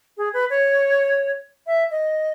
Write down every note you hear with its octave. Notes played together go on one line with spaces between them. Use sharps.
G#4
B4
C#5
E5
D#5